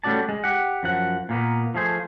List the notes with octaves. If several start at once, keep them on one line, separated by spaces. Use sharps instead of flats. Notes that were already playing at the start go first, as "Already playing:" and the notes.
G3 A3 C#4 F#4 D5 A5
G#3
G4 F#5
F#2 F3 F#5
A#2 A#3 B3
F3 A3 G#4 C5